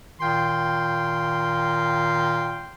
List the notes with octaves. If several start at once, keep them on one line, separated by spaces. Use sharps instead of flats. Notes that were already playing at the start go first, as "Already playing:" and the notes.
A#2 D#3 F5 G5 C6